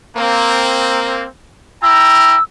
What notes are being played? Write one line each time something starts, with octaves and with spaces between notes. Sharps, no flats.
A#3 C4
E4 G5 A#5 E6